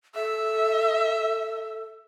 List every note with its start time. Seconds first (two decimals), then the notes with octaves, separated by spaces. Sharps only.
0.15 A4 E5